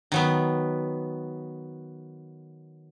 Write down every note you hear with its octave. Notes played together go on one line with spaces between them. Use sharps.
D#3 F#3 B3